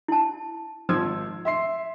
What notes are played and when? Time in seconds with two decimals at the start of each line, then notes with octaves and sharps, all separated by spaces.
0.08 E4 A5
0.89 G#1 F3 E6 G#6
1.45 E5 C6 C7